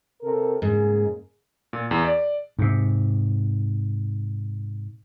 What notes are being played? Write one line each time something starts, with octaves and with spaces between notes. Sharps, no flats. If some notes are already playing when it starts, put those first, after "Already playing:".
C3 A4 A#4
G#2 C#3 A#3 G#4
A#2
E2
D5
G#2 C3